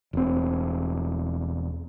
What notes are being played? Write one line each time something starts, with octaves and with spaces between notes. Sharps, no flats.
E1 C4